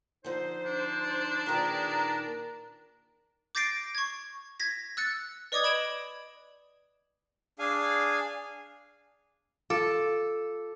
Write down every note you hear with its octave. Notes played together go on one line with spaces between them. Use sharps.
D3 F3 D#4 C5
D4
A#2 D#3 G#4 B4 A#5
D6 G6 A6 A#6 C7 D7
C#6 G#6
G#6 A#6 B6
E6 F#6 A6 C#7
B4 D5 D#5 D6 D#6 G#6
B5 G#6 D7 E7 F#7
D4 G#4 F5 G#5
F4 A4 D6